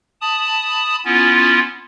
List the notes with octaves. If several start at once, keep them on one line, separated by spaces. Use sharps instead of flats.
A5 B5 D#6
B3 C#4 E4 F4